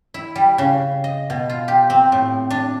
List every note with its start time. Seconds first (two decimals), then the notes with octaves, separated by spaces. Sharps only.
0.14 E4
0.36 G3
0.58 C#3
1.04 D#5
1.30 B2
1.49 F4
1.68 G4
1.90 C4
2.12 A2
2.50 D4